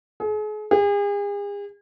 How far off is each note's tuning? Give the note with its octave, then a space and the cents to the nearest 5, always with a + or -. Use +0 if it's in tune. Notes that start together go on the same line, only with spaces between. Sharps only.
G#4 +40
G#4 -40